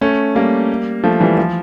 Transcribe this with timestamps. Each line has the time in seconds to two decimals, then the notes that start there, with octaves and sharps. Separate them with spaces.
0.01 A3 C#4
0.35 G3 A#3
1.03 F3 A3
1.20 E3 G3
1.37 F3